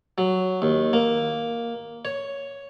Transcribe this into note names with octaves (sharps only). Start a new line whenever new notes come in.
F#3
D#2
A#3
C#5